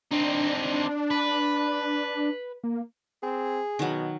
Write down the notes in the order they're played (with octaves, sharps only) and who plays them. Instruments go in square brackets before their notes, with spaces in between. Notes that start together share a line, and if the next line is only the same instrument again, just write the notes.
[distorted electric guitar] C4 D#4 [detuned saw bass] D4
[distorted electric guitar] B4
[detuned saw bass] A#3
[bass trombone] C4 [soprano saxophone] G#4
[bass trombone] B2 [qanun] D#3 F#3